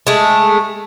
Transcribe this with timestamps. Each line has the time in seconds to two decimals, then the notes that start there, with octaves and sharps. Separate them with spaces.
0.07 G#3 A3